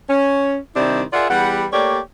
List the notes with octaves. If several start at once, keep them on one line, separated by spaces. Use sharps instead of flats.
C#4
C3 D#3 G3 D4 E4
F4 G#4 A#4 D5 E5 F#5
E2 G3 G4 B4 F#5
A3 A#3 G4 C#5 D5